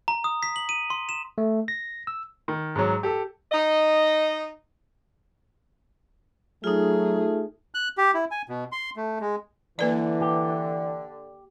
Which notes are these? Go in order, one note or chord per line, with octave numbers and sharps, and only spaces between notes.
A#5
D#6
B6
F#7
D#7
C6
E7
A3
A#6
E6
D#3
G#2 F#3
G4 A4
D#4 D#5
F#3 A3 D#4 F4 G#4
F#6
G4
E4
G#5
B2
C6
A3
G#3
D3 E3 A#3 B4 D5
G4